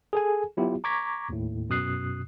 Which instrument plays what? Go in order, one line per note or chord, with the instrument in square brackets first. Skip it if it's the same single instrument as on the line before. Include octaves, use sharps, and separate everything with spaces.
[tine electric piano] G#4 A4 G#5
F#3 B3 E4 F4 G4
A#5 C#6 D6 G#6 A#6 B6
D#2 A2
F#2 B2 D#6 F#6 C7